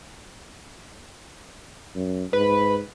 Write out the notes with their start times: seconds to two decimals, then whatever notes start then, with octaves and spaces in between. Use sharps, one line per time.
1.95 F#2
2.33 G#2 B4